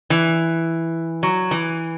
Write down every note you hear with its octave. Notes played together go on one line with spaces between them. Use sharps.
E3
F#3
E3